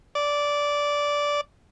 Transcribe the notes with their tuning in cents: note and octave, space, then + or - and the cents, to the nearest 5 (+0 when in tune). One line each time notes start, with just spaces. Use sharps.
D5 -10